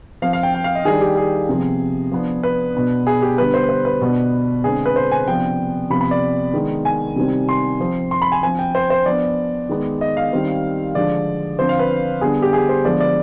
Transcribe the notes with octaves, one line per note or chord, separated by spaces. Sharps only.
F3 C4 F5
F5
G5
G5
F5
D#5
D#3 G3 D4 G#4
G4
G#4
C3 F3 B3
F3 B3 D4
B4
B2 B3 D4
G#4
G4
D3 G3 B3 B4
C5
C5
B4
B2 B3 D4
D3 G#3 C4 G#4
B4
C5
G#5
C3 F3 B3 D4 G5
C3 F3 B3 B5
B5
D5
D#3 G#3 B3 D4
G#5
C3 D#3 G3 C4
C6
F3 C4
C6
B5
G#5
F3 C4 G#5
G5
C5
C5
F3 B3 D4 D5
D#3 G#3 B3
D#5
F5
D#3 G3 C4
D3 F3 G#3 D5
D3 F3 C4 C5
F5
B4
D3 G3 B3 G#4
G4
G#4
C5
D3 F3 G#3 B3 D5
D5